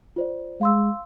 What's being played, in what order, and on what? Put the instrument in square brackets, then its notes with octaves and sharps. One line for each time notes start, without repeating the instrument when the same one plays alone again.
[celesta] F4 C5 D5
[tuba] G#3 [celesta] F5 C6 E6